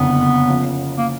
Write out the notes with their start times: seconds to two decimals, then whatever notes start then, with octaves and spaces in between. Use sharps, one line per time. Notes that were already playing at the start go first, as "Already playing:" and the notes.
Already playing: F#1 F2 D3 B3
0.48 C#3 F3 A#3
0.98 A#3